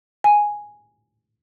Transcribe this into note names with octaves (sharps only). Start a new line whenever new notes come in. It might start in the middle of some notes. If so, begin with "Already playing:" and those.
G#5